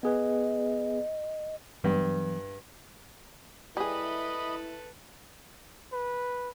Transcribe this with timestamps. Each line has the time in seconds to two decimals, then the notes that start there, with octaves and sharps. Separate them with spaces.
0.03 B3 G#4 B4 D#5
1.84 G2 E3 F#3 B3
3.77 G3 E4 G#4 A4 B4 D#5 B5
5.93 B4